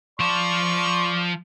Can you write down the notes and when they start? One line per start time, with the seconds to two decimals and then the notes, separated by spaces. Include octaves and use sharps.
0.20 F3 D5 A5 C6 C#6